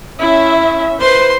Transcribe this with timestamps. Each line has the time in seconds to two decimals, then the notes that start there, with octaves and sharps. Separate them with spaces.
0.19 C#4 E4 E5
1.01 B4 C5 C6